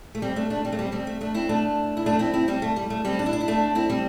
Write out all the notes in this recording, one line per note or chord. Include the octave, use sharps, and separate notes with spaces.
A3
G3 C4
A3 D4
A3 D4
G3 C4
A3
G3 C4
G3 C4
A3
A3 D4
C4 E4
A3 D4
E4
A3 D4
C4 E4
C4 E4
G3 C4
A3
G3
A3
G3 C4
D4
E4
D4
E4
A3 D4
C4 E4
G3 C4